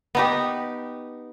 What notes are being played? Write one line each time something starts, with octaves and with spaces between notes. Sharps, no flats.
B3 D#4 G4